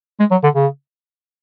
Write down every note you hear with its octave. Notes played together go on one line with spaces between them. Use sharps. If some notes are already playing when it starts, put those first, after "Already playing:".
G#3
F#3
D3
C#3